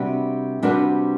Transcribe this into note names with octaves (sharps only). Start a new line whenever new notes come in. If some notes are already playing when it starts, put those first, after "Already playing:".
Already playing: C3 G3 D4 F#4 B4
C3 G3 D4 F#4 B4